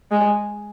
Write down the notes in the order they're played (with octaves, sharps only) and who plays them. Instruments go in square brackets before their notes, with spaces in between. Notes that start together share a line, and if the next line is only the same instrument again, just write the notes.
[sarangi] G#3